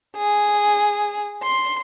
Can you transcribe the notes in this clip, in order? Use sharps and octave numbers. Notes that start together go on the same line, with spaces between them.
G#4
C6